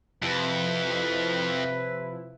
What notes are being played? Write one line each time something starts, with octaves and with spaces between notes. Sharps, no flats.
F2 C3 F3 E4 B4